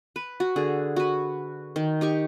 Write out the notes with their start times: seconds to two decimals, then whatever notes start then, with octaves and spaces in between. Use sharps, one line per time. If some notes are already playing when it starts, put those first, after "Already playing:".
0.16 B4
0.40 F#4
0.56 D3 G#4
0.96 F#4 B4
1.76 D#3
2.01 D#4 G4 C#6